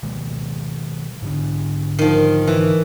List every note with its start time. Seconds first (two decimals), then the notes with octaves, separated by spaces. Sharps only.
0.03 B2 D#3 G#3
1.22 G#2 D3 D4
1.99 D#3 F3
2.47 E3